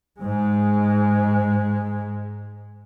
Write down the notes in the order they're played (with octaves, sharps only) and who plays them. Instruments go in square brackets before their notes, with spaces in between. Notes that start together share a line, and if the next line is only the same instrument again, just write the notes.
[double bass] G#2 G#3